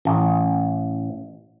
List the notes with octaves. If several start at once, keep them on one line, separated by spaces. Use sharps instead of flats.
A1